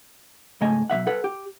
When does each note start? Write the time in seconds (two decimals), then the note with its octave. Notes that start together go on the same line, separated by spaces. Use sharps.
0.61 G#2 C#3 A3 D#5 G#5
0.90 B1 G#3 E5 F#5
1.07 A4 B4 F#5
1.24 G4